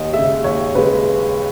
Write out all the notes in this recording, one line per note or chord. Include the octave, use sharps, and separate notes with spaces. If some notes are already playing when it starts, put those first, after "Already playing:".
Already playing: D#2 D#5
G#3 E5
C#3
D#2 C#5
C#3 G#3 B4